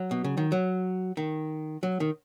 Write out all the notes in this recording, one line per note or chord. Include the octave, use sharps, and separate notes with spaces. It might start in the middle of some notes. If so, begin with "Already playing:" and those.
Already playing: F#3
B2
C#3
D#3
F#3
D#3
F#3
D#3